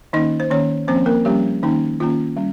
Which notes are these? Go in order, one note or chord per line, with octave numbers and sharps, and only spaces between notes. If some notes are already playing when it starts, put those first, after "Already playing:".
D#3 A#3 C#4 D#4 D#5
C5
D#3 A#3 C#4 C#5
F3 A#3 C4 C#4 C5
A#3 A#4
F3 G3 A#3 C#4 G4
D#3 A#3 C#4 D#4
D#3 A#3 C#4 F4
G3 C#4